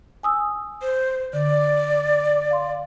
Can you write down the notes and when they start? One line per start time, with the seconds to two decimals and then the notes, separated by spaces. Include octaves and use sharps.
0.23 G#5 D#6 E6
0.82 C5
1.33 D3 D5
2.51 F5 C6